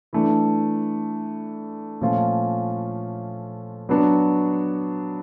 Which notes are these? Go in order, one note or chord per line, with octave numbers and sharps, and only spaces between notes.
E3 A3 D4
A#2 F3 A3 C#4 F4
F#3 B3 D4 F#4